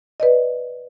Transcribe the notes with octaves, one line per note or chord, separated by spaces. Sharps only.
B4 D5 D#5